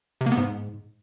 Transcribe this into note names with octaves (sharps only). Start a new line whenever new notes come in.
C3
A#3
B3
G#2